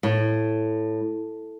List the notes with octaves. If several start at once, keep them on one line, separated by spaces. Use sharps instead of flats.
A2